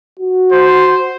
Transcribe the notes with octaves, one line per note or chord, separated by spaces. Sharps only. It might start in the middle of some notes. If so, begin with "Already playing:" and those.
F#4
C5